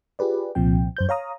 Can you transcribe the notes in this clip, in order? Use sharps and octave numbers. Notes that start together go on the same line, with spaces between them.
F4 G4 G#4 B4 D5
C2 A#2 F3 C4 G5
F#2 C5 G6
C#5 F5 A#5 D#6